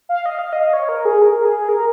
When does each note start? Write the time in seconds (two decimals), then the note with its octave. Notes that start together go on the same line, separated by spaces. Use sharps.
0.09 F5
0.26 D#5
0.39 F5
0.53 D#5
0.73 C#5
0.89 A#4
1.05 G#4
1.22 A#4
1.45 G#4
1.69 A#4